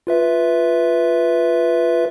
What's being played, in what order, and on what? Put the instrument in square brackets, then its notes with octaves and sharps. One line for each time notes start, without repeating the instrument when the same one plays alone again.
[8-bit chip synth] F4 B4 E5